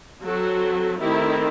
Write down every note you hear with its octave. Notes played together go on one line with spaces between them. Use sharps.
F#3 C4 F#4 A4
D#3 A3 C4 E4 G4